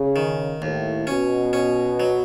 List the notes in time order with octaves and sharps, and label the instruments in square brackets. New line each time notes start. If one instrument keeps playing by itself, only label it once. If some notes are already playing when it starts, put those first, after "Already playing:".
Already playing: [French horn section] C#3
[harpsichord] D#3
[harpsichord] D#2 [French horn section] A2
[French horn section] B2 [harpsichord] C#4
[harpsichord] C#4
F#3